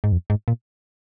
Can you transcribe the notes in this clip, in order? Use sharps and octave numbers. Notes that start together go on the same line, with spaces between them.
G#2
F2
G#2
A#2